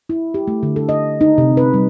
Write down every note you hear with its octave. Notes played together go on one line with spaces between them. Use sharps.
E4
G4
A3
D3
A4
D#5
D#4
C3
B4
G3